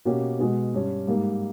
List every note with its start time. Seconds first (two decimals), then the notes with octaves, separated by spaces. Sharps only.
0.05 B2 A#3 C#4 G4
0.39 B2 G#3 B3
0.74 G2 G3 C#4
1.07 G#2 G3 A#3